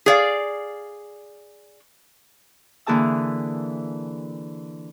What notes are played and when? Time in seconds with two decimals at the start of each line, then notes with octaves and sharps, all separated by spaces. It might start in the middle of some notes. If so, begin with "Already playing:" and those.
0.06 G#4 D5 F5
2.86 D3 E3 A#3 G#4 A5 E6